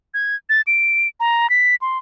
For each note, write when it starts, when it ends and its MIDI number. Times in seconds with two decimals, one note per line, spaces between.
0.14 0.36 92
0.49 0.61 93
0.67 1.08 98
1.20 1.50 82
1.50 1.75 95
1.82 1.98 84